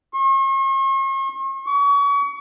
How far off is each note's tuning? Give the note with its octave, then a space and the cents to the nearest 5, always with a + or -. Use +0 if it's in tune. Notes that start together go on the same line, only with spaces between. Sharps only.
C#6 -45
C#6 +35